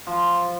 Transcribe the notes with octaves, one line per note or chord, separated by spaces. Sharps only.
F3